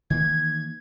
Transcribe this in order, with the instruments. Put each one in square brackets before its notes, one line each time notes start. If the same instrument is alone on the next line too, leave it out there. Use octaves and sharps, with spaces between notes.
[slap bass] D#3 E3 A#3 [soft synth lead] G#6